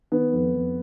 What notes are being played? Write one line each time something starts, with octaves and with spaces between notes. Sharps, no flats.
D#3 B3
F2
F2